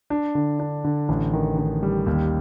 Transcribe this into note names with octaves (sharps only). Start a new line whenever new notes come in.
D4
D3
D4
D3
A1
D#3
D#3
G3
D#2